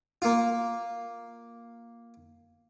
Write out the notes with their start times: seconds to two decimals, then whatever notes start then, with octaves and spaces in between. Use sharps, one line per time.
0.22 A#3 F4